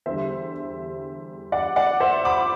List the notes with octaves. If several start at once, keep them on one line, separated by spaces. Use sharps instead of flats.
E2 D3 G3 C5 E5
D5 F#5
D5 F#5
C5 E5
B5 D6